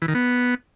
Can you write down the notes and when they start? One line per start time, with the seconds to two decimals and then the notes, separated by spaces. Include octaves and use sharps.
0.02 E3
0.08 D#3
0.15 B3